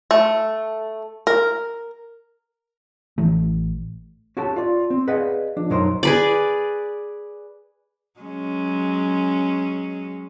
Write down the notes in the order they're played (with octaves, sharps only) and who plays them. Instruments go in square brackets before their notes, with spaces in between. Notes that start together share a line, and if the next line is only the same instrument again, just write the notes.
[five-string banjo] A3
A#4
[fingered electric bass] A1 E3 A3
[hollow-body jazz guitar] C#4 F#4 G4 A4 G5 A5
F4 D5
C4
G#4 B4 D5 D#5 F5 F#5
F3 D4
B1 F#2 F#3 D#4 A#4 C5
[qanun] G#4 B4 D5
[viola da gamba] F#3 G#3 C#4